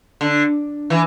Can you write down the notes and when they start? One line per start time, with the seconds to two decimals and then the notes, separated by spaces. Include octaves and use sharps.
0.21 D3
0.90 E3